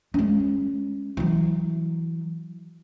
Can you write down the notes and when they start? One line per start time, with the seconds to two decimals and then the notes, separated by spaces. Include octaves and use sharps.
0.14 G#3 C#4
1.17 E3 F#3